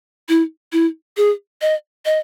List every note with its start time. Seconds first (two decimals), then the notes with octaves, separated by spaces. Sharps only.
0.29 E4
0.72 E4
1.17 G#4
1.61 D#5
2.05 D#5